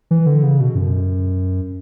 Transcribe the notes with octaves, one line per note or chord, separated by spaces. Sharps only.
E3
D3
C#3
B2
F#2